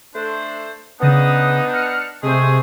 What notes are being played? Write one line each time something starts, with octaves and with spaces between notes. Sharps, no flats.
A3 D4 C5
C#3 B3 D4 D#4 D#6
F6 C#7
C3 G#3 A3 G#4 C5